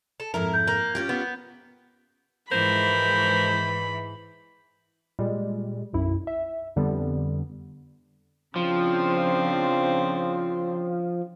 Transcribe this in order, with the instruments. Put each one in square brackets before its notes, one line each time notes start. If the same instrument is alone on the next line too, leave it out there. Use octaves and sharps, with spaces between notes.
[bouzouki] A4
[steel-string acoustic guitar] F2 G#2 E4 [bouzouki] A#4
[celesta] G6
[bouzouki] A#3
[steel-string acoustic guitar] C#4 F4 G4
[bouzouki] B3
[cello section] G#2 E3 [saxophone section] F3 A#4 C5 [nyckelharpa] B5
[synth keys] A#2 G3 G#3
B1 F#2 E4
E5
F2 D3 G3 B3
[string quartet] C#3 C4 D4 [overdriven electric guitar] F3